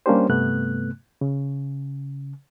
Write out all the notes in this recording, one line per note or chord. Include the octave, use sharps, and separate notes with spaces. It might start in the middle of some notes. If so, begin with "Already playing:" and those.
G3 A#3 C#4 D4 G4 C5
G2 C3 A3 B3 F#6
C#3